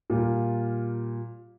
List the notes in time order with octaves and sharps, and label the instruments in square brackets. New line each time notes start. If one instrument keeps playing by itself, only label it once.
[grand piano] A#2 G3 F4